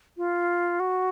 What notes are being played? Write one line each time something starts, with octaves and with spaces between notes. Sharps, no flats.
F4
F#4